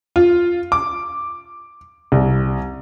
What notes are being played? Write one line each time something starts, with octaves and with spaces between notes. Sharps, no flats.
F4
D6
C2